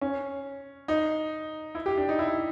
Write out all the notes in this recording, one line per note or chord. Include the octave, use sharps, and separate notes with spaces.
C#4
D#4
E4
G4
D4
D#4
E4